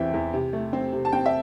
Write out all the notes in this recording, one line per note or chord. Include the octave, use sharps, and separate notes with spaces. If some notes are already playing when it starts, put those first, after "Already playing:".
Already playing: E2 C3 E3 C4 E5 G5
E2
C3
A3
C4
C3
A5
C4 G5
E5